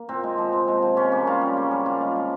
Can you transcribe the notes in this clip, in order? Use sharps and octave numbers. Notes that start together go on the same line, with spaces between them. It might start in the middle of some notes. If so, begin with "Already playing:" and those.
Already playing: A#3
A#2 C4
G#3
F3
C3
G#3
F3
C#3 C#4
A#3 C#4
G3 F4
C#3
A#3
G3
A#2 F4
G#3
F3